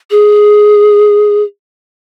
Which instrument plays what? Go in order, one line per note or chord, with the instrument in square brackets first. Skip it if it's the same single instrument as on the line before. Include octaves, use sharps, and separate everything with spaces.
[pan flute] G#4